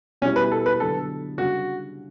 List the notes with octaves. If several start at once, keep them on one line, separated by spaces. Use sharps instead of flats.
B2 G3 B3 C#4 E4 G4
B4
A4
B4
D3 F#3 B3 A4
C#3 G3 D4 F#4